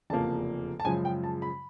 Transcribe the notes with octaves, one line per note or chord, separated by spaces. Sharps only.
F1 E2 C#3 F3 A#3 A5
A5
F#2 C#3 F3 G#3 G#5
G5
A5
B5